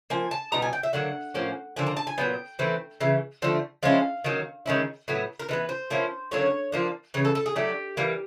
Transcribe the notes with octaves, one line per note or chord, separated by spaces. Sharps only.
F3 A#3 G#5
A5
B2 G3 B3 D#4 A#5
G#5
G5
E5
D3 F#3 A#3 F#5
A2 F3 A#3 C#4
D3 F3 A#3 D4 G#5
A#5
A5
G#5
A#2 F#3 B3 G5
E3 A3 C4
C#3 E3
D3 F3 A3
F3 G#3 C#4 E4 F5
D#3 F#3 A#3 C#4
D#3 G#3 C#4 E4
A2 F#3 B3
A#4
E3 G#3 B3 B4
C5
F3 A#3 C#4 E4
D3 F#3 A#3 C#4 C#5
F3 A#3 D4
C#3 E3 C#5
A4
A4
G#4
F#3 A3 D4 G4
E3 G3 A#3